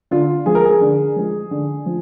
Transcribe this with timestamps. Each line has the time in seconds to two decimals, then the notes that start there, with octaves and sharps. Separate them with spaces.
0.11 D3 F4
0.46 F3 G#3 G#4
0.55 A#4
0.64 G#4
0.81 D3
1.16 F3 G#3
1.51 D3
1.86 F3